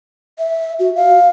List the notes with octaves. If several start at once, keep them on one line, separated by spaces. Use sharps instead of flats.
E5
F#4
F5